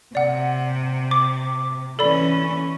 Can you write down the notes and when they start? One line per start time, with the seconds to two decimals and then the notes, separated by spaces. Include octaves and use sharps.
0.15 C3 D5 F#5
1.11 D6
1.99 E3 C#4 A4 D5 B5